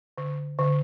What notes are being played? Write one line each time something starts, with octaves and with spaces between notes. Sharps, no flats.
D3
D3